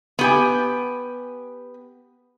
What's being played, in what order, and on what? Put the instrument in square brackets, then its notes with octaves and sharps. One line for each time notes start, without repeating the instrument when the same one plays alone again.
[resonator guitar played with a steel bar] B3 G4 G#5